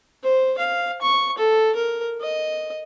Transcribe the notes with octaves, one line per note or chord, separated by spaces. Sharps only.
C5
F5
C#6
A4
A#4
D#5